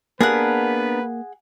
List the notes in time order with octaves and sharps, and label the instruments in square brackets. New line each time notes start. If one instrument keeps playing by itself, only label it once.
[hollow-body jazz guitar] A#3 [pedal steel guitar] B3 D4 A#4 [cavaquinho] G#4 F#5 [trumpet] B4